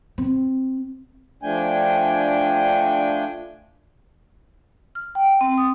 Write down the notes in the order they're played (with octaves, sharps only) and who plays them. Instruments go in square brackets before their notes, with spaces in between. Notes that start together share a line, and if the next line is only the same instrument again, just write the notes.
[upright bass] C4
[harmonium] F3 A3 D4 G5 G#5
[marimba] F6
G5
C4
D#6